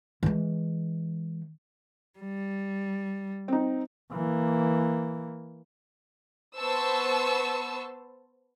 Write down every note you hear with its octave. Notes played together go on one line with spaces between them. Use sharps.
E3 G#3
G3
C4 D#4
E3 A#3
B3 B4 C5 A5 C#6 E6